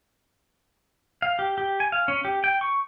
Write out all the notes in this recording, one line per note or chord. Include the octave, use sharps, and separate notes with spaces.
F5
G4
G4
G#5
F5
C#4
G4
G5
C#6